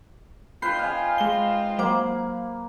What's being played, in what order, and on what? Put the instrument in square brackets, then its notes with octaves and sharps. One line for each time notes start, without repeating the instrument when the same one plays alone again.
[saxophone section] C4 D#4 F4 [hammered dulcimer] B4 [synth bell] G6 C7
[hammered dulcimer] F5 G#5
[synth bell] G#3 G7
[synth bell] F#3 C5 D6 [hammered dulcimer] A#3